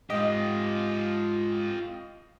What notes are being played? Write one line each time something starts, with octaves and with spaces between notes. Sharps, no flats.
G#2 F4 G4 D#5